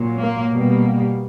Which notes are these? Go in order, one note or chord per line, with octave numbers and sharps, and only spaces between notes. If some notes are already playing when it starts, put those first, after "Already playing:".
Already playing: A#2 F#3
A#3
B2 G3 A#3